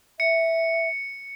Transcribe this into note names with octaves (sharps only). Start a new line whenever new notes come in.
E5 C#7